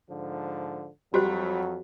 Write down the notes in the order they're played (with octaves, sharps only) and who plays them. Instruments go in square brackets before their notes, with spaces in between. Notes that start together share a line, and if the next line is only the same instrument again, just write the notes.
[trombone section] G#2 D3 F3
[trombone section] F2 F#3 [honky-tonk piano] G3 [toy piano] F#4 G4 C5